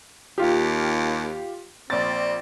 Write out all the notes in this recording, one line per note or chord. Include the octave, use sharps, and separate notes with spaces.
D#2 F4 G4
A#1 C4 A6